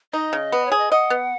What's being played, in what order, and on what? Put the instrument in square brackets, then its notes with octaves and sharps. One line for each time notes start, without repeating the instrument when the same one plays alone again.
[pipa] D#4 [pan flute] D#5
[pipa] C#3
B3
[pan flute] C#5
[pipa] G#4
[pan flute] D#5
[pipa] D#5 [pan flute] F#5
[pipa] B3